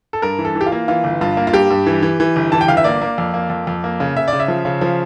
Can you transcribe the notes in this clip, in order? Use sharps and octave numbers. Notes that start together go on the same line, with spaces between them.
A4
G2 A#4
E3
A4
E3
G4
F4
A#3
E3 F4
G1
G2 F4
A#3
F4
G2 G4
G2
E3
E3
E3
G1
E3 A5
G5
G1 F5
E5
A#3 D5
A#3
F2
A#3
F2
F2
A#3
C#3
C#3 E5
D5
C#3
E5
F3
C#3
F3